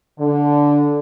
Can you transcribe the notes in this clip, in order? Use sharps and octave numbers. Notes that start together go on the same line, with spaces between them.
D3